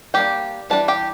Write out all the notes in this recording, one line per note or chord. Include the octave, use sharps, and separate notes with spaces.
G3 A#3 D4 G4 G5
E3 G3 D4 A5
G4 G5